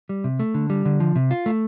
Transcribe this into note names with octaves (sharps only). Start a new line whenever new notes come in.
G3
C3
A3
D3
G3
D3
F3
C3
F4
A3